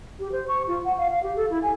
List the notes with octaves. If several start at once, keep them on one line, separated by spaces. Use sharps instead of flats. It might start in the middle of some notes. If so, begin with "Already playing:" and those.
G4
C5
C#6
F4
F#5
F5
F5
G4
A4
E4
G#5